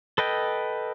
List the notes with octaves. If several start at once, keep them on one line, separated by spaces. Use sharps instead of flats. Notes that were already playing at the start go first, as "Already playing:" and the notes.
A4 B4 D#5 G5